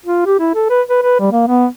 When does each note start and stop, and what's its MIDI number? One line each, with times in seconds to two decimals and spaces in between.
0.06 0.22 65
0.26 0.38 67
0.39 0.53 64
0.55 0.69 69
0.70 0.82 71
0.89 1.00 71
1.03 1.17 71
1.20 1.30 55
1.32 1.44 58
1.48 1.66 59